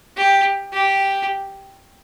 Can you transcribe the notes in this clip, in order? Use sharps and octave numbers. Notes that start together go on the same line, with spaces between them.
G4
G4